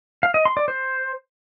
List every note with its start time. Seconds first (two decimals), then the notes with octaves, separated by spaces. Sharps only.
0.23 F5
0.34 D#5
0.45 C6
0.57 D5
0.68 C5